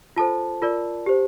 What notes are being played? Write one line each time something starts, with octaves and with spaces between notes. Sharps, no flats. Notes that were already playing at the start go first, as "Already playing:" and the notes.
F4 A4 C5 A5
F4 A#4 D5
G4 C5